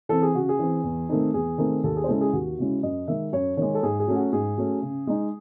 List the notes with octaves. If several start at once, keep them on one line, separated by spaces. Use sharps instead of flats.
E3 C4 A4
G#4
C#3 F#4
G#4
E3 C4
E2
D#3 A3 C4 D#4
E2 G#4
D#3 A3 C4 D#4
D#2 A4
G#4
C5
C#3 G#3 C#4 E4 A4
G#4
D#2 F#4
C#3 G#3 C#4 E4
F#2 D#5
D#3 G#3 E5
F#2 C#5
D#3 G#3 C#5
A4
G#2 G#4
G#4
F#3 A3 C#4
F#4
G#2 G#4
F#3 A3 C#4
C#3
G#3 D#4